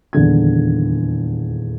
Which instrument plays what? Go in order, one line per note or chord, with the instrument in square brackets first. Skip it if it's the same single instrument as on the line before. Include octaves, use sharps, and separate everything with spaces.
[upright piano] D#1 E2 D3 G#6